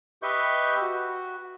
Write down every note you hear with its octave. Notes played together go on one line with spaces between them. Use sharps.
G4 B4 D#5 E5 C#6 G6
F#4